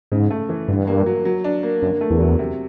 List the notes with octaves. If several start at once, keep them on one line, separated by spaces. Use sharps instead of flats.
G#2 C#3
A3
E3
G2 D3
A#3
F#3
F#3
D4
A#3
F#2 D3
A3
E2
F#3
C3